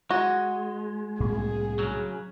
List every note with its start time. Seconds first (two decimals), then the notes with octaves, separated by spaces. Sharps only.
0.10 G#3 F#4
1.20 C2 A2 A#3 G#4
1.79 C#3 F#3